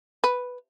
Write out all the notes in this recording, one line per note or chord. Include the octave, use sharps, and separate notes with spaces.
B4